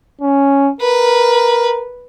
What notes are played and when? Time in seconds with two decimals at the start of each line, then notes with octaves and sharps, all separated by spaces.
0.21 C#4
0.81 A#4 B4